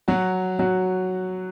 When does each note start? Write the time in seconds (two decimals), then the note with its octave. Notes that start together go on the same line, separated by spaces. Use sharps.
0.08 F#3 F#4
0.59 F#3 F#4